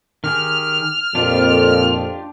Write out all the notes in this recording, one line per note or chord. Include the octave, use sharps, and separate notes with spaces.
D#3 G4 G#4 F6
F2 A#2 D4 F4 G4